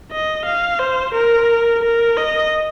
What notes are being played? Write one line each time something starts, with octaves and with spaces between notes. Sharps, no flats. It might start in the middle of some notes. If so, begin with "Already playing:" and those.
D#5
F5
C5
A#4
A#4
D#5